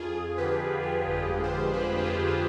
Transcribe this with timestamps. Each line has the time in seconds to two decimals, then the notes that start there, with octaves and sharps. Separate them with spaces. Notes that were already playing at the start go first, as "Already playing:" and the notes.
Already playing: F2 F4 G#4
0.16 F2
0.37 D3 G4 B4
0.61 D3
0.83 D3 F4 G#4
1.06 G1
1.13 G4 B4
1.29 G#3
1.44 G#4 C5
1.51 D3
1.74 G#3 G4 B4
1.97 G#3 G4
2.04 F4 G#4
2.19 F2
2.28 F4